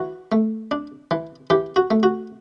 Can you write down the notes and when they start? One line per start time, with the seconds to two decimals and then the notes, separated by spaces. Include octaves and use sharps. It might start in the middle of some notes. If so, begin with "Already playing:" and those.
Already playing: E3 F#4
0.32 A3
0.71 D4
1.11 E3
1.50 E3 G4
1.76 F#4
1.91 A3
2.03 F#4